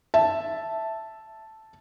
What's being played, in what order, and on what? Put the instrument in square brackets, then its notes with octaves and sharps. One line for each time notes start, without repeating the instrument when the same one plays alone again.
[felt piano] E5 A5